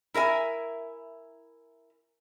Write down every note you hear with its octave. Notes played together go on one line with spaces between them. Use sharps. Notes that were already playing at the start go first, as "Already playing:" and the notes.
E4 A#4 E5 G#5